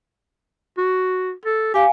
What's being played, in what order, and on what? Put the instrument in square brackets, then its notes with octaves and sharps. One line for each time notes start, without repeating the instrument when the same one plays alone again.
[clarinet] F#4
A4
[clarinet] G4 [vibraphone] F5 G#5